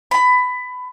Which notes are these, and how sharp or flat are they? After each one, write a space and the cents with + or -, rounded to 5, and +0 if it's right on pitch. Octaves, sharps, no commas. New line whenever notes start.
B5 +20